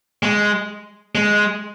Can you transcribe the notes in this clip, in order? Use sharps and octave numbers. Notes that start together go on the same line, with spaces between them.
G#3
G#3